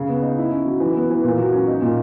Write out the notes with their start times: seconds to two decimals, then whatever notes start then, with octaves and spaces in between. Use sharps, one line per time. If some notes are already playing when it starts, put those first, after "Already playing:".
Already playing: C#3
0.09 B3
0.22 D#4
0.37 E4
0.51 C#4
0.66 F#3
0.80 E3
0.95 B3
1.10 E3
1.24 A#2
1.38 F#3
1.53 C#4
1.67 D#4
1.82 A#2